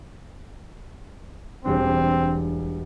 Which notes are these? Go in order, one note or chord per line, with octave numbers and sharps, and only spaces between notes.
E1 G3 C4 D4